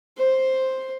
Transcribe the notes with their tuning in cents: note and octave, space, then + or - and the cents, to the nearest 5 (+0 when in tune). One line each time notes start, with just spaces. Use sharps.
C5 +5